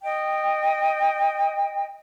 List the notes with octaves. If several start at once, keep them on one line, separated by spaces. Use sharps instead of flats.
D#5 G5